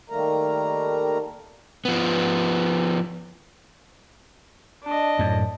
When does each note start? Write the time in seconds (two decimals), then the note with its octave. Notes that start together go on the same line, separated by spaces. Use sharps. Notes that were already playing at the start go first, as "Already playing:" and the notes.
0.10 D#3 G3 A3 A#3 A#4 A#5
1.85 F3 B3
4.84 D4 D#5
5.19 F#2 A2